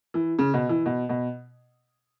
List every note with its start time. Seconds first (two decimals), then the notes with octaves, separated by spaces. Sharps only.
0.14 E3
0.39 C#3
0.54 B2
0.69 E3
0.86 B2
1.09 B2